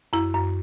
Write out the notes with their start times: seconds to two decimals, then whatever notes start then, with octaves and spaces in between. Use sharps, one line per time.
0.13 F#2 E4
0.34 F#2